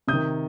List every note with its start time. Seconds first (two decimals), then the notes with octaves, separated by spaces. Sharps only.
0.08 C3 D#6 G6
0.13 D#3